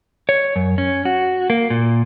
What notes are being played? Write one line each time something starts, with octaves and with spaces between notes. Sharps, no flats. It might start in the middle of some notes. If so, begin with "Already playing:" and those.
C#5
F#2
C#4
F#4
A#3
A#2